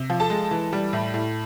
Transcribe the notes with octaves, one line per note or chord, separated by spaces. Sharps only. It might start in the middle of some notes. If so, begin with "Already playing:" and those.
Already playing: C3
F3
A4 A5
G#3
E3
G3
A2
A2